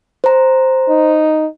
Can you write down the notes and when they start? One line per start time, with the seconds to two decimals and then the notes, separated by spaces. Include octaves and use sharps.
0.24 C5 A#5
0.89 D#4